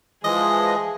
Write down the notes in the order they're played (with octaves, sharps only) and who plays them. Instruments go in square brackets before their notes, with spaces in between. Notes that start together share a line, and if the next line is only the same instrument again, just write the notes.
[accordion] E3 F3 G#3 [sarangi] G#4 [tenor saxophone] D#5